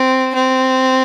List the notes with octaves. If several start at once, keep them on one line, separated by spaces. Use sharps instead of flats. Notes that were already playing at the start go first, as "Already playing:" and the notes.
Already playing: C4
C4